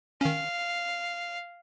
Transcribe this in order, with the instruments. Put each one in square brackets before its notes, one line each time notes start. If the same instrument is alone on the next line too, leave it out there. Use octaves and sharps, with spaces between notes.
[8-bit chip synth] D#3 C#4 [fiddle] F5